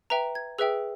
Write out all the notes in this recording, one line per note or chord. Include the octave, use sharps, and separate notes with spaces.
B4 E5 G5 A#5
G#6
G#4 B4 E5 G5 E6